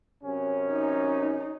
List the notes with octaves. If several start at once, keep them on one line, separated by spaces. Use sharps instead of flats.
F#2 C3 C#4
D#4